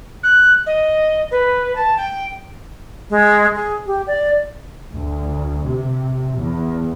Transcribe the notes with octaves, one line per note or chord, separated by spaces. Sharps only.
F#6
D#5
B4
A5
G5
G#3
G#4
G4
D5
D2
C3
E2